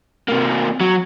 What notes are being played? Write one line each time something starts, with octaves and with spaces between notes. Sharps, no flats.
C3 A#3
F#3